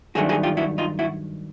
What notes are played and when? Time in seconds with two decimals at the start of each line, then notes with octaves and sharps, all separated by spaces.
0.15 G2 D#3 F#3 A3 D4 F#4 G#4
0.29 F#4 G#4
0.43 F4 G4
0.57 E4 F#4
0.78 D#4 F4
0.99 E4 F#4